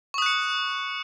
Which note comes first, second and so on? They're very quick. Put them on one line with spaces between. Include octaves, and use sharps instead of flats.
C#6 D#6 F#6 C#7